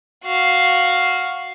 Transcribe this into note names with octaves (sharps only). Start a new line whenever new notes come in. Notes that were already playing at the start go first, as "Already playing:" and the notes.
F#4 F5